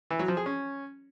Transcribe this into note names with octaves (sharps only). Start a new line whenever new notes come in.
E3
F#3
F3
G#4
C#4